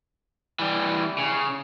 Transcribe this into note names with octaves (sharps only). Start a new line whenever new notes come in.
E3 G3
C#3